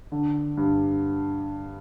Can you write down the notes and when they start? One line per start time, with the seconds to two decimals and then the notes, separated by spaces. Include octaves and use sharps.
0.12 D3
0.57 G2